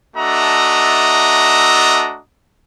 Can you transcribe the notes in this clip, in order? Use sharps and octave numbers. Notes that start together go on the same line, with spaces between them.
A3 D4 F#4 D#5 E5 A#5